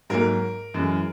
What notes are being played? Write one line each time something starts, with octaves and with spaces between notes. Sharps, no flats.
G#2 F#3 A#3 A#4
F#2 E3 G#3